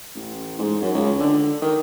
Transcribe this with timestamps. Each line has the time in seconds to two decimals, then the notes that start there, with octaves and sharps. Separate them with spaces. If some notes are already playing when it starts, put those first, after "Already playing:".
0.15 A1
0.59 G#2
0.82 F#2
0.95 C#2
1.20 D3
1.62 D#3